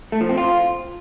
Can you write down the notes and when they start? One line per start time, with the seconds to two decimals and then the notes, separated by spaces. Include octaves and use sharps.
0.12 A3
0.21 F3
0.29 C4
0.38 F4